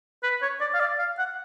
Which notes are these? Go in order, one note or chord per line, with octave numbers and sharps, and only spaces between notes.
B4
C#5
D5
F5
D5
F5
F#5